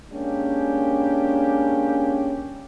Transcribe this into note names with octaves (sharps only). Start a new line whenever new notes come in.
G#3 A#3 C#4 D4 G4